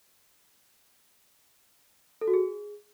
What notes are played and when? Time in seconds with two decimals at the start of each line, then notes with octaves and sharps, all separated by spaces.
2.21 A4
2.28 F#4
2.34 G#4